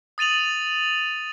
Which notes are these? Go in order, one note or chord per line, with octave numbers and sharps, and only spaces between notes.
D#6 A6 D#7 F7 F#7